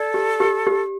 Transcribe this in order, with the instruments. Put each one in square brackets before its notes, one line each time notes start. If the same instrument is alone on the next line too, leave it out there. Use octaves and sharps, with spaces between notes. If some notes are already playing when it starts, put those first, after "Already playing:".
Already playing: [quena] A4 [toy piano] D5
[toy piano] G4
G4
G4